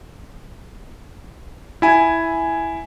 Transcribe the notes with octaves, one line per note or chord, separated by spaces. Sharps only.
E4 G#5